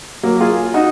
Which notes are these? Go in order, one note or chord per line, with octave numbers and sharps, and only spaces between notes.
F#3 A#3
F4 G#4
D#4 F#4